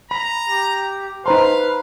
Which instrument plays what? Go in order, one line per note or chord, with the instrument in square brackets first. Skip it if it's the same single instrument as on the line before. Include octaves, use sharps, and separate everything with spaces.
[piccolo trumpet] A#5 [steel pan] B5
[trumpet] G4
[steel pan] D#4 C5 C6 [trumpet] B4 [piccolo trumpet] F5 [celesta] A5 A#5